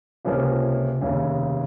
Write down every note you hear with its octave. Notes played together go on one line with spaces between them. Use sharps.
C#2 C3 F3 A#3 C#4
F1 D#2 C#3